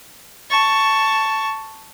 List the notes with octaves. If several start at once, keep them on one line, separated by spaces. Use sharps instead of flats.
A5 C#6